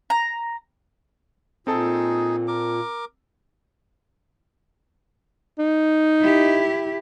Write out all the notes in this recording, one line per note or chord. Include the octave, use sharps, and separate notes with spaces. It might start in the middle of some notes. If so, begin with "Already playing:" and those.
A#5
A#2 C4 D#4 G#4 A4 A5
A#4 D6
D#4
E4 G4